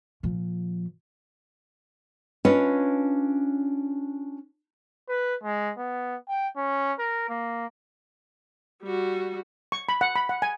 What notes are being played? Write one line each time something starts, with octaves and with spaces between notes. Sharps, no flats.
A#2 F3
C#4 D4 F4 B4 C#5 D#5
B4
G#3
B3
G5
C#4
A#4
A#3
G3 F#4
C#6
B5
F#5
B5
F#5
G#5